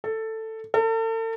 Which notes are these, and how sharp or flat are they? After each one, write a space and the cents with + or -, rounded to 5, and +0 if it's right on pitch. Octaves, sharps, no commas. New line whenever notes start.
A4 +10
A4 +40